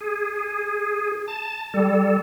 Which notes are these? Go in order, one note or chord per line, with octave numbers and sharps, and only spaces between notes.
G#4
A5
G3 A4